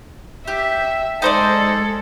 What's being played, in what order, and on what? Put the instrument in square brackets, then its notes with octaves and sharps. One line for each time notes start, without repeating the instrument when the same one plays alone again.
[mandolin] G4 [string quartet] E5
[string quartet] G#3 A4 [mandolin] D#4 C5 D5